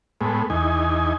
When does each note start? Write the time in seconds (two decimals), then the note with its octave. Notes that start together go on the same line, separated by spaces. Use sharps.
0.21 A2 G#3 B3
0.50 E2 D#4 G#5